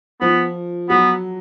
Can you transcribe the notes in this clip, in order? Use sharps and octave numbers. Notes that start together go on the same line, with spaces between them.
F3 B3
F#3 B3